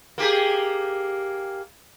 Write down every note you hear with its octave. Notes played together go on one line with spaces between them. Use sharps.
A#3 G4 G#4